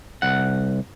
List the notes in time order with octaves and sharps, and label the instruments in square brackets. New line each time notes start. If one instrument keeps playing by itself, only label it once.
[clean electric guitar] C2 F#5